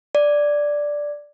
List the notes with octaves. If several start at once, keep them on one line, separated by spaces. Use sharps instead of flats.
D5